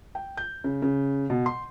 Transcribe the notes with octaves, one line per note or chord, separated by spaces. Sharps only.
G5
G6
C#3
C#3
B2
C6